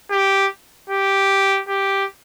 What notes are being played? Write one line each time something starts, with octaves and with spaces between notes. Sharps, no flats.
G4
G4
G4